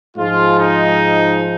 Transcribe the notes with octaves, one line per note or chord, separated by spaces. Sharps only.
G#2 F3 G#3 F4
D#4